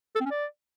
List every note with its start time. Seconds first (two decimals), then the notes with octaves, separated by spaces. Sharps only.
0.15 A4
0.21 C4
0.26 C#4
0.31 D5